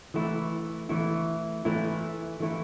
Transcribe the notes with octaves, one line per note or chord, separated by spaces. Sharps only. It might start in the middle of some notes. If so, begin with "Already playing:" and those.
E3 A3 E4
E3 A3 E4
E3 A3 E4
E3 A3 E4